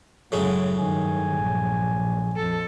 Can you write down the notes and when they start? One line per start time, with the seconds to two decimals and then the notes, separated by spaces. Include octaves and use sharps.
0.32 F#2 A2 C#3 F#3 G#3
0.78 G2 D#3 G#5
1.37 A#1
2.36 F2 A4